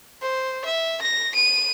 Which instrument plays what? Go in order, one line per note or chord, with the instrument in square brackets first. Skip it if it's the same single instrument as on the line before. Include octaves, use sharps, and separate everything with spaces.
[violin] C5
E5
A#6
D#7